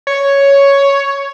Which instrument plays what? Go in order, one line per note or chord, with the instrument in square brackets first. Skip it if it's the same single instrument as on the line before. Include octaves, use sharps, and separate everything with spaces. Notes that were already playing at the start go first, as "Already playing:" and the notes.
[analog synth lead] C#5